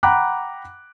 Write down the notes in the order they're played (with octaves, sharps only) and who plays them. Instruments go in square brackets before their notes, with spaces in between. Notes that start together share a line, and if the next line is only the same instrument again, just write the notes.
[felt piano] F#5 G5 A#5 B5 D6 F#6